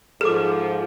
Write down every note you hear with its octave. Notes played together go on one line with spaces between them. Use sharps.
G#2 F3 G#4 A4 D6